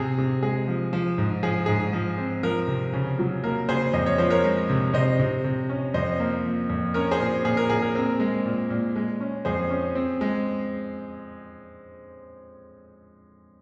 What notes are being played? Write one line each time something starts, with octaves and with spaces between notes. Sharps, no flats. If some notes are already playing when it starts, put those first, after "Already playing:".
Already playing: C3 G#4
C3
G#3 G#4
F3
F3
G#2
F3 G#4
G#2 G#4
F3
C4
F3 A#4
C3
C#3
F#3
A#3 A#4
C#3 G#4 C5
F2 D#5
C#5
F3 C5
A#4 C#5
G#3
C3
C3 C5 D#5
C3
C3
C#4
F2 C5 D#5
A#3
F3
F2
C#4 A#4 C#5
G#4 C5
A#2
A#2 G#4
A#4
A#2 G#4
A#4
C4 A#4
G#3
A#2
A#2
G#3
C#4
F2 G#4 C5
C#4
C4
G#3